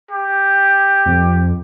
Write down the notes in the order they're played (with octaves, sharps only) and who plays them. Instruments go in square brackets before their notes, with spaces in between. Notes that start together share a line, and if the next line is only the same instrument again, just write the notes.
[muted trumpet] G4
[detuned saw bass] F2